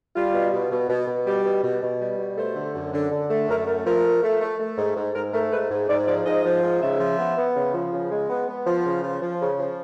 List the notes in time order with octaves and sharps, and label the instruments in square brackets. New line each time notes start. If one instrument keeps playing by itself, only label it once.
[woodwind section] G3 F4
B2
B2
B2
B2
B2
G3 G4
B2
B2
B2
G3
B2
A3 C5
D3
F#2
D3
D3
A3
F#2 A#4
A3 A#4
F3 A#4
A3
A3
A3
A3
G#2
G#2
G#2 A#4
A3 A#4
G#2 B4
G#2
G#2 D5
F3 D5
G#2 D#5
F3
G#2
C#3 E5
F3
B3
B3
C#3
F3
C#3
G#3
B3
B3
F3
C#3
F3
F3
C#3
F3